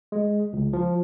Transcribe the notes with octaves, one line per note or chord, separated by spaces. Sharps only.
G#3
C#2
F3